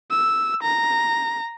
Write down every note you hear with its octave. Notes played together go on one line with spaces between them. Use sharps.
E6
A#5